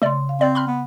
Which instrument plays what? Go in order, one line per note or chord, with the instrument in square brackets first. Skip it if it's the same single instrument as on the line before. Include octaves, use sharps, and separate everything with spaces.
[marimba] C#3 C6 [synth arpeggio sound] A3 D5
[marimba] F5
[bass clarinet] C4 [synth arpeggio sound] D5
[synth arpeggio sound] B5 C6 F6
[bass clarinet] B3